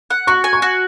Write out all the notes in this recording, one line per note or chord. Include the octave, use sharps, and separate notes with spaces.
F#5
F#4 C#6
G#5
C#6
F#4